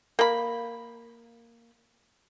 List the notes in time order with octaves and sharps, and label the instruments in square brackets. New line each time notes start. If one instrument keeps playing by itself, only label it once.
[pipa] A#3 B5